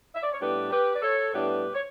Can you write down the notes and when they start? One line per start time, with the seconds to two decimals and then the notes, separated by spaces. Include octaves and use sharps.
0.14 E5
0.22 D5
0.31 C#5
0.40 A2 G3 B3 D4 G4 B4
0.71 G4 B4
0.93 D5
1.02 A4 C#5
1.32 A2 G3 B3 D4 G4 B4
1.73 C#5